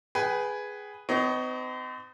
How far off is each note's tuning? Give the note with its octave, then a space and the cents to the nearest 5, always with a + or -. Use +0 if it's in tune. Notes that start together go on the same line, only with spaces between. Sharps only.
G#4 +0 B4 +0 G5 -30
C4 -45 D#4 +0 C#5 +20